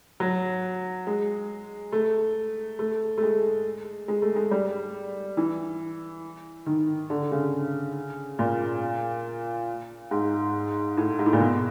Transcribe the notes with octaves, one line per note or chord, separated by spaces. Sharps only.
F#3
G#3
A3
A3
A3
G#3
G#3
A3
G#3
G3
E3
D#3
D3
C#3
A#2
G#2
A2
G#2
A2
A#2
B2